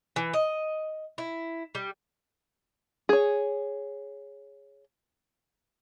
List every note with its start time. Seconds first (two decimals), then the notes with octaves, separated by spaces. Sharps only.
0.16 E3
0.33 D#5
1.18 E4
1.75 G3
3.09 G#4 C#5